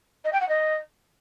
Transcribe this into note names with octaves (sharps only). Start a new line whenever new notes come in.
D#5
G5
F#5
D#5